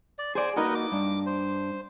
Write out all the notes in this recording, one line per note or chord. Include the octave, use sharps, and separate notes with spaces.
D5
G#4 C5 D5 G#5
A#3 D#4 F#4 A#4 B4 D#5
D6
G2 D4
C5